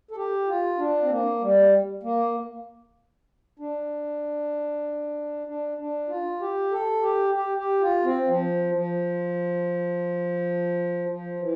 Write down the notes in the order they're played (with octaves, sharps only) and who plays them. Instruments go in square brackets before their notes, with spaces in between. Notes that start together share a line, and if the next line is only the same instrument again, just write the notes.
[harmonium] A4
G4
F4
D4
C4
A#3
G3
A#3
D4
D4
D4
F4
G4
A4
G4
G4
G4
F4
C4
F3
F3
F3
E3